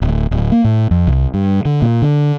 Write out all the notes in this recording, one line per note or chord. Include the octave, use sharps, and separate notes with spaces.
D1
D1
A#3
A2
F2
C2
G2
D3
A#2
D3